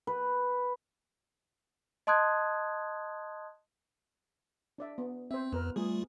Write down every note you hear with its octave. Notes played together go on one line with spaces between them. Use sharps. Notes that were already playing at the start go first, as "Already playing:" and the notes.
B4
D#5 A5 C6 D#6 F#6 G#6
D4 D5 E5
B3
C4 C5 E5
F2 B3 A#4 B4
G3 A3 F4 G#4